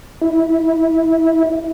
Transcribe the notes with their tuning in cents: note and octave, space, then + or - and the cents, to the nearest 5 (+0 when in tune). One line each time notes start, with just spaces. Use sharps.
E4 -15